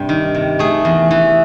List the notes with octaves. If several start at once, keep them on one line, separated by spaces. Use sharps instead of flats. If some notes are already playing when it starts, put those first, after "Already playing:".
Already playing: G2 C3 G3 G4
D#3
C3
A3 G#4
E2
E3